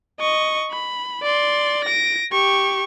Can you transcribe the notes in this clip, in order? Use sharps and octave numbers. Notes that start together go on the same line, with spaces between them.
D#5 C#6
B5
D5 C6
A#6 D7
G4 C#6